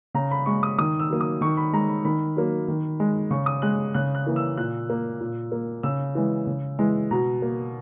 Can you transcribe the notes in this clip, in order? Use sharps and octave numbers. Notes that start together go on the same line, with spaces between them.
C#3 A#5
B5
G#3 C#6
D#6
D#3 D#6
E6
F#3 A#3
D#6
D#3 C#6
B5
G#3 A#5
B5
D#3 B5
F#3 A#3
D#3
G#3
C#3 C#6
D#6
G#3 F#6
C#3 F#6
F#6
E3 A#3
E6
A#2 F#6
A#3
A#2
A#3
C#3 E6
E3 G#3
C#3
E3 G#3
B2 A#5
A#3